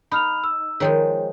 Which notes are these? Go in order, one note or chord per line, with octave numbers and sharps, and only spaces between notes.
D#4 B5 F6 F7
E6
D#3 F3 G#3 G#4 C#5 G5